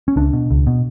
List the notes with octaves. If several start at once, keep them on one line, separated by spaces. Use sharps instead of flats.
C#4
C#2 D4
B2
C#2
B2